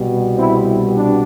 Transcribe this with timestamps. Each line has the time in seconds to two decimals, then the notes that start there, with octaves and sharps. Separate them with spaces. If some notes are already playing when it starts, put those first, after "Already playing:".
Already playing: C2 B2 G3
0.37 C4 E4
0.95 D4